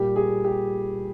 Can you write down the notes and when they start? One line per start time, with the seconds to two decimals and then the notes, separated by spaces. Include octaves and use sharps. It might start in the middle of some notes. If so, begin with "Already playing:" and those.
Already playing: A#2 G3 G4
0.16 G#4
0.44 G4